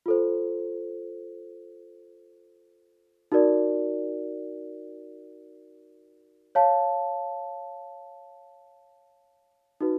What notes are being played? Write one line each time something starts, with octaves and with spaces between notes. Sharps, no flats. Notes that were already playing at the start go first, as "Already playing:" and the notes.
F4 A4 C5
D#4 F#4 A#4 D5
C#5 F5 A5
D#4 F#4 B4